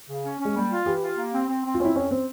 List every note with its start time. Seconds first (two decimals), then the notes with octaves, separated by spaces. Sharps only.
0.09 C#3
0.24 C#4
0.39 C#4
0.45 G#3
0.55 G3 A#3
0.70 F4
0.86 E3 G4
1.02 F4
1.17 A#3
1.33 C4
1.48 C4
1.65 C4
1.75 F4
1.80 C4 C#4 E4
1.96 F2 C#4
2.11 C4